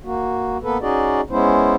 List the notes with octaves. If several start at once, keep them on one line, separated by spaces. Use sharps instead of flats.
A#3 F#4
A#3 B3 A4 B4
C#4 D#4 F#4 G#4 D5 D#5
G#3 B3 C#4 E4 C5